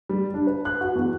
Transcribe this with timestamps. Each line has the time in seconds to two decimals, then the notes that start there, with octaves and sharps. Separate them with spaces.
0.09 G3
0.34 D4
0.47 B4
0.65 F#6
0.81 F#4
0.95 E2